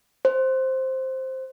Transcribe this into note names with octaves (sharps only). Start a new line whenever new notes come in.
C5